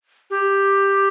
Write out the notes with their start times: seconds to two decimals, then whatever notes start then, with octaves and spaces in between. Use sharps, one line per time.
0.30 G4